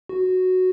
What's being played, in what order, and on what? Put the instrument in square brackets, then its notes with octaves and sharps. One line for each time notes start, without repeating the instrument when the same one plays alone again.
[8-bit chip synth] F#4